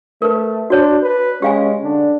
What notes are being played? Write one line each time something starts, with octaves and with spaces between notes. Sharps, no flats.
A3 A#4 B4
D4 F#4 C#5
B4
G#3 C#4 G4 F5 G#5
D3 D4